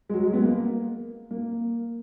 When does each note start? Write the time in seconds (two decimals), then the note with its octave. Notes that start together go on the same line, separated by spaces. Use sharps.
0.10 G#3
0.14 F#3
0.24 G#3
0.33 B3
0.44 A#3
1.31 A#3